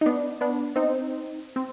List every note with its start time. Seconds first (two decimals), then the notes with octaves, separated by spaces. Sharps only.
0.01 D#4
0.06 B3 D4
0.41 B3 D4
0.76 C4 D#4
1.56 C4